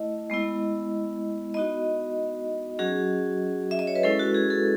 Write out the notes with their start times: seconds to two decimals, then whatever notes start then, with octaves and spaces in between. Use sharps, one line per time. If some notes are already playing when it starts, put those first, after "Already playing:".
Already playing: A3 E4 D#5
0.30 G#3 B3 E4
1.54 B3 D#4 F#4 D#5
2.79 F#3 C#4 F#4 G#4
3.71 E5
3.79 D#5
3.87 C#5
3.95 B4
4.03 G#3 C#4 E4 A4
4.20 F#4
4.35 G#4
4.50 A4